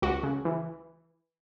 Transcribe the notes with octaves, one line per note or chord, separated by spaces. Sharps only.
C#2 F#4
C#3
E3